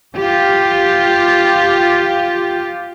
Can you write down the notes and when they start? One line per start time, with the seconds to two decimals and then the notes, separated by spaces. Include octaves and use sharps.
0.15 F4 G4